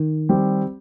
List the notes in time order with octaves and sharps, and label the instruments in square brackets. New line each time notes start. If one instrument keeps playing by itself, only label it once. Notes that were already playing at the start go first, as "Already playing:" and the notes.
Already playing: [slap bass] D#3
[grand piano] G3 C4 G4